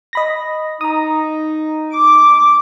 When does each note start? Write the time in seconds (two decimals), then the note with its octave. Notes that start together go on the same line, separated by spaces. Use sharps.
0.13 D#5 B5 A#6
0.81 D#4 A#5 D#6
1.94 D6